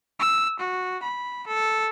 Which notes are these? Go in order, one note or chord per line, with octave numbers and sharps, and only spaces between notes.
E6
F#4
B5
A4